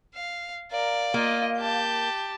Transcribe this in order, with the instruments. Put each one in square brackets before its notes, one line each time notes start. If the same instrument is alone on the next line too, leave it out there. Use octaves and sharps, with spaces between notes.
[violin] F5
[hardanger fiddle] A#4 [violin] D5 [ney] F5
[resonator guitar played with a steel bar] A#3 [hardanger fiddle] F4 D#5
[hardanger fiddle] G4 A5 [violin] G6